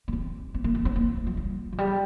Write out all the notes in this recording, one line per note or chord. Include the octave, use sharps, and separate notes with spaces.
A#3
C4
C4
A#3
A#3
C4
A#3
A3
F3
G3
F3
G3